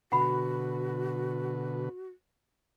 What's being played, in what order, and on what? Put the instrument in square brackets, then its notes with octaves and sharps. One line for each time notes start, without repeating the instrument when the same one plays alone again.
[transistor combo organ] B2 D3 B4 [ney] F#4 [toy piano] F#5 B5